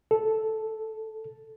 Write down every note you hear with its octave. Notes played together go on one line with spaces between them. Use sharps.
A4